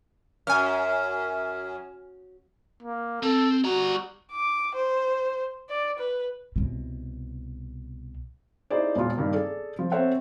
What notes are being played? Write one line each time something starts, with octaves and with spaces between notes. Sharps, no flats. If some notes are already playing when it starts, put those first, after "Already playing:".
F#2 G#5 F6
A#3
C4 A4
G3 F#4 A#5
D6
C5
D5
B4
C2 B2
D#4 E4 G4 G#4 C5 D5
E1 A#2 F4
G2 D#3 A#3
G#4 A4 D5
F3
C4 A4 C5 C#5 E5 F#5